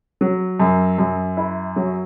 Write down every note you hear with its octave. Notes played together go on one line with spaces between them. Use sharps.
F#3
F#2
F#2
E4
F#3